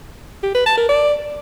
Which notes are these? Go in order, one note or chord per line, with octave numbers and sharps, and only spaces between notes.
G4
B4
A5
A#4
D5